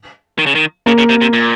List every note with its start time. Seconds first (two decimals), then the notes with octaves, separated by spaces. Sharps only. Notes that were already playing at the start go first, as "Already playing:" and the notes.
0.39 D#3
0.46 C#3
0.55 D#3
0.86 C#3 A#3
0.98 C#3
1.09 C3
1.21 C3
1.33 A#2